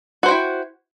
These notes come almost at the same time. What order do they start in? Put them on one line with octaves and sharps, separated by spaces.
F#4 C5 G5 E4